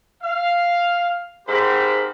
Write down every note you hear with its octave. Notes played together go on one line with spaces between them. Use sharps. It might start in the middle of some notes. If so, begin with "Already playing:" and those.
F5
G#2 C4 G4 A#4 C5 B5